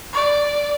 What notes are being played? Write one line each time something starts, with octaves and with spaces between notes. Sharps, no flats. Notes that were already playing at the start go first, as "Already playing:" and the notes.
D5